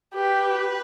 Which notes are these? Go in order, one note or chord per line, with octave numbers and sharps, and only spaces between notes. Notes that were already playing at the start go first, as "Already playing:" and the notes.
G4 B4